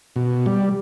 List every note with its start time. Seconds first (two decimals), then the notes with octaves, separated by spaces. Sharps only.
0.16 B2
0.46 G3